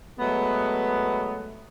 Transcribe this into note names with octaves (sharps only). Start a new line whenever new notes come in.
F#3 G#3 A3 B3